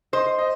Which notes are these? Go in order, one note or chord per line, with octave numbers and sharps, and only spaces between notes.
C5 D#5
D#5